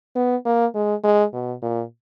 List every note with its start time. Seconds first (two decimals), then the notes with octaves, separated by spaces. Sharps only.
0.16 B3
0.45 A#3
0.75 G#3
1.03 G#3
1.33 B2
1.62 A#2